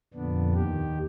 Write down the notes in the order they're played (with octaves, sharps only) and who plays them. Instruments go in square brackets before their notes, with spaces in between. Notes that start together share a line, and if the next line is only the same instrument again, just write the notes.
[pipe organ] F2 A#2 D3 B3 D4
D#2 D#3 G4